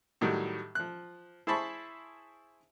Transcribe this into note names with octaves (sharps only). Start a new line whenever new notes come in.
A2 D#3 F#3 G3
F3 F#6
E4 G#4 C5 A5 B5 C#6